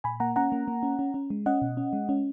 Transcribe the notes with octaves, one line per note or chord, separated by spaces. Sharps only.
A#2 G#5 B5
A#3 F#5 A#5
C#4 F#5 A#5
A#3
A#3
C#4
C#4
C#4
G#3
C#4 D#5 F#5
B2
C#4
G#3
C#4